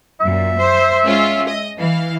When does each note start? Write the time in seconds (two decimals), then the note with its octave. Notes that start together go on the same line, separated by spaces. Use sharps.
0.20 F#2 A#2 E5
0.59 C5
1.03 G#3 C#4 F4
1.48 D#5
1.79 E3 F5